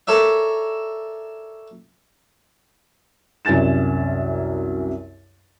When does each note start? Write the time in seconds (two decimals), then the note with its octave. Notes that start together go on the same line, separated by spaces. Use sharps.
0.07 A4 A#4 C#5 D5 E5
3.45 C2 F#2 G#5 A6 E7